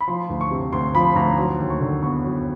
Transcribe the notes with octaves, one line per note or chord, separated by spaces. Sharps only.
B5
F3 C6
D2
C#6
C3
D2 C6
F3 B5
D2 A#5
F#3 C6
D#2
C#6
D3
B3 C#6
F#3